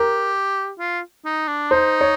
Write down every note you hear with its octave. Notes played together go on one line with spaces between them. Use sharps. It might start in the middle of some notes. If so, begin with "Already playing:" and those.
Already playing: G4 A#4
F4
D#4
D4
D#4 C5
C#5